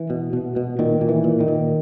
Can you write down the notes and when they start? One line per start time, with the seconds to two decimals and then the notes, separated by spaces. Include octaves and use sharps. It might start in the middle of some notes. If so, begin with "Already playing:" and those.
Already playing: E3
0.10 B2
0.33 B2
0.56 B2
0.79 A#2 D#3
1.01 A#2
1.09 E3
1.24 A#2
1.40 D#3
1.48 A#2